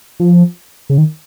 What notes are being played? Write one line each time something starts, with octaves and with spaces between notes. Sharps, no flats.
F3
C#3
D#3